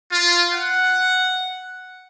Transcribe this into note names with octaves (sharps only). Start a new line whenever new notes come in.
F4
F#5